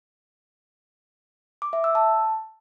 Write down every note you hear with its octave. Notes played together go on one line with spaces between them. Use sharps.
D6
E5
E6
A5